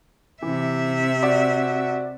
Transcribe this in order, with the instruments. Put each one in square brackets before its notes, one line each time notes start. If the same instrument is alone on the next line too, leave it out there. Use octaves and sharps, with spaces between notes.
[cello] C3 E5 [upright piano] E3
[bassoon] F#4 [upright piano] D5